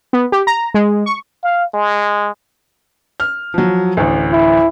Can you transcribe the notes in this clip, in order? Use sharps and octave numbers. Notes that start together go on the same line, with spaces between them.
B3
G4
A#5
G#3
C#6
F5
G#3
F6
F3 F#3
A1 D2
E4